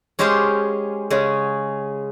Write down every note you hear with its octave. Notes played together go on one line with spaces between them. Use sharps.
G#3 C#4 G4 C5 F5
C#3 G#3 C#4